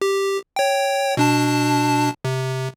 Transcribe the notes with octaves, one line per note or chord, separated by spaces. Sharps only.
G4
C#5 G5
B2 D4 A5
C3